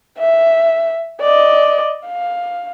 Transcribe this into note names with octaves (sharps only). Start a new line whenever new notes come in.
E5
D5 D#5
F5